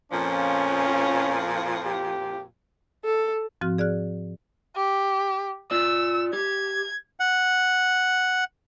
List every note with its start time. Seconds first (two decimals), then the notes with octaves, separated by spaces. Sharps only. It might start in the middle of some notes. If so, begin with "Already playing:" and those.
0.12 F2 A#2 F3 C#4
1.85 G4
3.05 A4
3.61 G#2 F3 C4 F#4 F6
3.78 G#4 D5 F6 F#6
4.76 G4
5.71 F4 D5 E6
6.33 G4 G#6
7.20 F#5